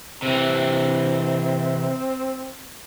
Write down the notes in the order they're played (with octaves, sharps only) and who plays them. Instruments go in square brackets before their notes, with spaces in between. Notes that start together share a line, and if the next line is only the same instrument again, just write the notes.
[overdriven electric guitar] C3 E3 [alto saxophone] C4